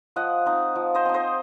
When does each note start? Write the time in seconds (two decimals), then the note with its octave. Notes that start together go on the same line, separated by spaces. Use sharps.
0.16 F3 D#5 F#5
0.46 C4 D#4
0.75 F3
0.95 C5 D#5
1.05 C4 D#4
1.14 C5 D#5